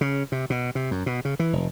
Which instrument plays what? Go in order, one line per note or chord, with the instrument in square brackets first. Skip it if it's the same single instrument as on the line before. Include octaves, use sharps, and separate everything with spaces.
[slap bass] C#3
C3
B2
C3
F#2
B2
C#3
E3
F1